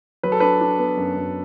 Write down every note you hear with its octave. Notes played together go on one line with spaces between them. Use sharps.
F#3 B4
A4
D4 B4
D4
B3
F#2
F#2